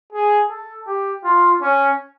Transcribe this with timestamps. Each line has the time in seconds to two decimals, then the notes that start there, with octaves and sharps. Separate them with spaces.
0.13 G#4
0.50 A4
0.87 G4
1.24 F4
1.62 C#4